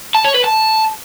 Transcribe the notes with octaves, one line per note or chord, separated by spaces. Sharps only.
A5
C#5
B4
A5